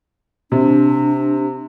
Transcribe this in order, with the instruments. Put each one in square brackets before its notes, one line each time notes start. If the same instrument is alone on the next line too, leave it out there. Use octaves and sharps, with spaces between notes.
[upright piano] C3 [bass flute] D4